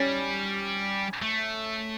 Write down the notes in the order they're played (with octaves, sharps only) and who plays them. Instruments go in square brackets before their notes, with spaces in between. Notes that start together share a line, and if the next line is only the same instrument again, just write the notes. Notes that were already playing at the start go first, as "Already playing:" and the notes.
Already playing: [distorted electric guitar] G3 [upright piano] C#4
[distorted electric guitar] A3